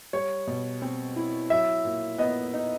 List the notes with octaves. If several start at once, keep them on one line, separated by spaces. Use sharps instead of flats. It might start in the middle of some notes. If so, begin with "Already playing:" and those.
G3 C#5
B2
C4
E4
F#3 E5
A#2
B3 D#5
D#4